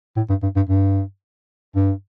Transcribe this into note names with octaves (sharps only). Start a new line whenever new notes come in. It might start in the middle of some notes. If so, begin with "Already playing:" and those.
A2
G2
G2
G2
G2
G2